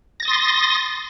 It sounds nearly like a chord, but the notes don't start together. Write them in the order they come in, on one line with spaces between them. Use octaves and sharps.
A#6 A6 D#6 C6